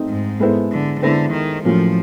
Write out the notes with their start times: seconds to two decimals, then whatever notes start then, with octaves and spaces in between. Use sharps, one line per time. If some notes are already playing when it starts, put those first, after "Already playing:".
Already playing: A3 C4 D#4
0.09 G#2
0.40 G#3 B3 E4 A4 C5
0.71 D3
1.02 D3 G#3 B3 E4 A4 C5
1.33 D#3
1.64 A2 F3 F#3 A#3 C#4 F4